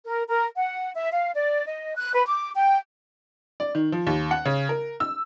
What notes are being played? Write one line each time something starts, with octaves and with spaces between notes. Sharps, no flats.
A#4
A#4
F#5
E5
F5
D5
D#5
F#6
B4
D6
G5
D5
D#3
F3
D#2
F#5
C#3
A#4
E6